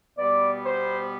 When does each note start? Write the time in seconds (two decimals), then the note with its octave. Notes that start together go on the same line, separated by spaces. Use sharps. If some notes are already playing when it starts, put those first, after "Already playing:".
0.18 B2 G3 B3 D5
0.65 C5